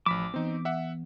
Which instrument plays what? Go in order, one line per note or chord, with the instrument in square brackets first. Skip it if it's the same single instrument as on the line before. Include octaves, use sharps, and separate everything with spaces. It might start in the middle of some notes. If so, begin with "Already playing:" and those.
[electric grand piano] A1 B6 E7 [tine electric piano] F3 B5 [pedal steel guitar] D6
[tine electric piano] E3 B3 [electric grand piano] C4 D#4
[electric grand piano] E5 F#5